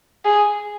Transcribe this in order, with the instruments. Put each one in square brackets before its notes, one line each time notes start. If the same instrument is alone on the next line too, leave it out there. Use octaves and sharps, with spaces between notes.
[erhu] G#4